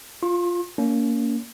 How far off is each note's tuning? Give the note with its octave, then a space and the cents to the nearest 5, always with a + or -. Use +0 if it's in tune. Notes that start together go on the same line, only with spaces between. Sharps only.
F4 +0 C6 +40
A#3 +0 C#4 +35